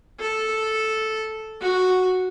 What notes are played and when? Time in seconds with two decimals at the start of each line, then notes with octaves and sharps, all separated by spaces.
0.20 A4
1.61 F#4